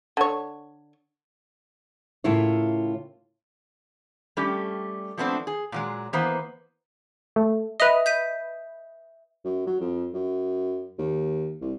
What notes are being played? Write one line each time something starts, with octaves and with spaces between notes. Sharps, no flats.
D3 C#5
A2 C#3 A#3 E4 F4 C#5
G3 A3 C#4 G4
F3 A3 B3 C4 D4
G#4
A#2 F#3 G#3
E3 A#3 B3 B4 C5
A3
B4 D#5 E5 D#7 F7
G6 B6 D#7
F#2
F#3
F2
F#2
D#2
C2